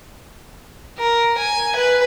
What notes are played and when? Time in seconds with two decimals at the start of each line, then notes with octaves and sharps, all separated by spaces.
0.98 A#4
1.38 G#5
1.75 B4